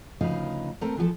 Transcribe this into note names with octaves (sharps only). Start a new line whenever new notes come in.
D2 C#3 F3 D#4 B4 F5
A3 C4 A4 A#4
E3 F3 G4 A4